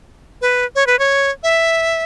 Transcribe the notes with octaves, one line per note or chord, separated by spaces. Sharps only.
B4
C#5
B4
C#5
E5